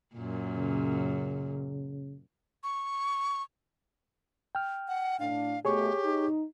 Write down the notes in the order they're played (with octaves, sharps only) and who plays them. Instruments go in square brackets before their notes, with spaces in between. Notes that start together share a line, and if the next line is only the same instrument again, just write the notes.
[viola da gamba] F#2 A#2
[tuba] C#3
[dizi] C#6
[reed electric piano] G5 F6
[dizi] F#5
[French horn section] A2 D4 [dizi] F5
[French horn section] B2 A3 [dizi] G4 [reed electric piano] G#4 C#5 C#6
[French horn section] D#4